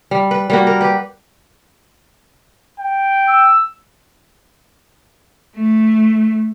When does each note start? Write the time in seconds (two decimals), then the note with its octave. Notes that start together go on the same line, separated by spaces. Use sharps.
0.11 G3
0.31 B4
0.50 G3 A#3 F#4
0.67 A#4
0.81 G4 B4
2.79 G5
3.28 E6
5.56 A3